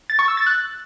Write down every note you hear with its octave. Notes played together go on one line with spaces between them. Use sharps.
A6
C#6
E6
A6
F#6